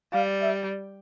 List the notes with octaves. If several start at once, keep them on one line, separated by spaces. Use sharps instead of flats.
G3 F5
E5